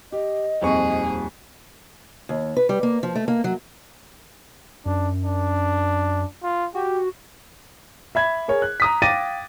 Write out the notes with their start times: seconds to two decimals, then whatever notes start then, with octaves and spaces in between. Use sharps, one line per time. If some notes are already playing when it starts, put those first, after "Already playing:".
0.12 G4 D#5
0.62 D#1 F2 G#4 C#6
2.29 D#2
2.57 B4
2.69 G3
2.83 A#3
3.03 F3
3.15 A3
3.28 A#3
3.44 F#3
4.86 F#2 D4
5.25 D4
6.43 F4
6.75 F#4 G4
8.15 E5 B5 G#6
8.48 G#4 A#4 C#5
8.62 F#6
8.80 A#5 D#6 B6
9.02 F5 G5 D6 A6 A#6 D#7